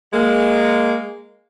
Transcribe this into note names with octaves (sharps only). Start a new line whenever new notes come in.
G#3 A#3